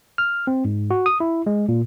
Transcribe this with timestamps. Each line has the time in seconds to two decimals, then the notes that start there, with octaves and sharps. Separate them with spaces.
0.18 F6
0.47 C4
0.65 G#2
0.91 F#4
1.06 D#6
1.20 E4
1.46 G#3
1.69 A#2